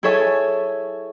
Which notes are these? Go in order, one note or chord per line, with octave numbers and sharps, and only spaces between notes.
E4 G#4 A4 C#5 E5 G#5